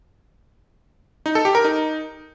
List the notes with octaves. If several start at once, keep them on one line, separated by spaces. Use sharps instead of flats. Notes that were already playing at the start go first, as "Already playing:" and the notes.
D#4
A4
G4
A#4
D#4